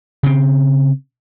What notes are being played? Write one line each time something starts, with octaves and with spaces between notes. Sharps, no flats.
C#3 C4